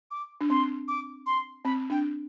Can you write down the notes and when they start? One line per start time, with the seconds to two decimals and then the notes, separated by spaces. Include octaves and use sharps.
0.11 D6
0.41 D4
0.50 C4 C6
0.88 D6
1.26 C6
1.65 C4 B5
1.90 D4 G5